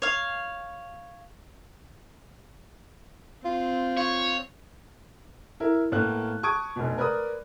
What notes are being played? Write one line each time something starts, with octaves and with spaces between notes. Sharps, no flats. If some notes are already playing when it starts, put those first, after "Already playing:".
C#5 F5
C4 F4
F4 C#5
E4 A#4
A2 A#3 B3 F#6
A5 C#6 D#6 G#6 D7
F1 B2
A#4 B4 D5 B5 D#6